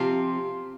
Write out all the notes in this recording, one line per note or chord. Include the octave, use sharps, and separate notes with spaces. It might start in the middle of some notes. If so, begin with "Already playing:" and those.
Already playing: C3 F3 C4 F4